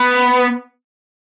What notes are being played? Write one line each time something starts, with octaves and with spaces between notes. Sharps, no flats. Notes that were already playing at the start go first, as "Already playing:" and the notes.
Already playing: B3